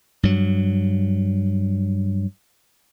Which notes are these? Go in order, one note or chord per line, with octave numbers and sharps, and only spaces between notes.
G2 F#3